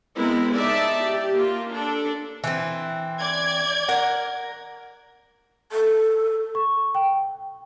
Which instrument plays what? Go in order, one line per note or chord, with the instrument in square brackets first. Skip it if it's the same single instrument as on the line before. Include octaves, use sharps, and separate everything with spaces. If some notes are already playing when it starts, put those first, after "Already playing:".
[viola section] G#3 B3 C4 E4 A#4
D#4 D5 E5 A5
G4
A#3 F4
D4 A4
[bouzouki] E3 C4
[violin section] D5 G#6
[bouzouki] A#4 F#5
[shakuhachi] A4
[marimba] C#6
G5